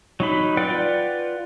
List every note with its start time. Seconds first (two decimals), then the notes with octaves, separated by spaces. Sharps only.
0.20 F#3 D#4 B5
0.57 F4 B4 D5 F#5 G5